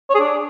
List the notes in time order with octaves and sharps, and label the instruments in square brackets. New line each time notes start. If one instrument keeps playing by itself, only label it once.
[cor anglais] C#5
G#4
D4